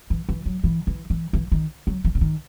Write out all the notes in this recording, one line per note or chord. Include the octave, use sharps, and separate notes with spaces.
E3
E3
F#3
E3
E3
E3
E3
D#3
F#3
E3
C#3
D#3